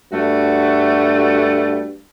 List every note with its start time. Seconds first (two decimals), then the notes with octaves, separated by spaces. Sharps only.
0.13 G2 A3 F#4